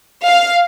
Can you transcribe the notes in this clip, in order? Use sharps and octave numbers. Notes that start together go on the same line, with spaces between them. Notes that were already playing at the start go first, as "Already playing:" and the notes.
F5